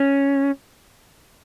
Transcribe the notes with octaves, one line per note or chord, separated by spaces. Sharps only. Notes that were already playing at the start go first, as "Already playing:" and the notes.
Already playing: C#4